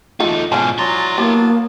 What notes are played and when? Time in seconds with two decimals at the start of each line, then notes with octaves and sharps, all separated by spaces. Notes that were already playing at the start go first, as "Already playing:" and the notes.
0.20 E2 A3 D#4 F4 A4
0.52 G#2 B2 F3 C#4 F5 A5 C6
0.78 F#3 E4 D5 A#5 C6
1.18 F#3 A#3 B3 G4 A5